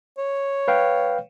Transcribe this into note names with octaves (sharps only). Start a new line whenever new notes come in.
C#5
B4 F5 G5